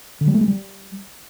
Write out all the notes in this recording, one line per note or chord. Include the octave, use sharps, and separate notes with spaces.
D3
G3
A3
G#3
G3